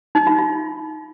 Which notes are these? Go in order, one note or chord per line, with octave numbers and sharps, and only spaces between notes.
D#4
F4
F4